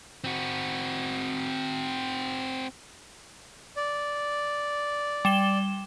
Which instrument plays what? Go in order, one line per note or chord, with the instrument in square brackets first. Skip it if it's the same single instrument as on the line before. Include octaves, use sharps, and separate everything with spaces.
[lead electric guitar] C4 F#4
[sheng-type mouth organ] D5
[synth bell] G3 E7 G7